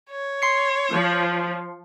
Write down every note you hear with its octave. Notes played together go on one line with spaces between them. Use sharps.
C#5
C6 C7 C#7
F3